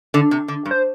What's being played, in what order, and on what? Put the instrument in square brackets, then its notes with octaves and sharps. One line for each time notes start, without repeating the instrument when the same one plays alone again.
[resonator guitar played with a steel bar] D3
C3
D3
G2
[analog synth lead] C5